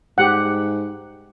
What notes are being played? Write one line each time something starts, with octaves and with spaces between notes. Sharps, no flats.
G#2 G4 F#5